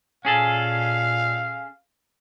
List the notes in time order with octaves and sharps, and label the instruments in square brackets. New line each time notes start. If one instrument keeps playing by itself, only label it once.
[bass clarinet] A#2 [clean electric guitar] C#4 G#4 A4 [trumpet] F5